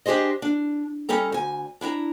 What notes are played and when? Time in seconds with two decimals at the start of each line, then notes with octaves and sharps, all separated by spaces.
0.06 D4 G4 G#4 C5 D#5
0.42 D4
1.09 G3 C#4 D#4 A4 A#5
1.32 D2 G#5
1.81 D4 E4 G#5 A#5